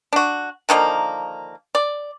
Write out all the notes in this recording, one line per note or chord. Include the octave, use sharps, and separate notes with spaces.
D4 F#4
D3 D#3 F3 A#3
D5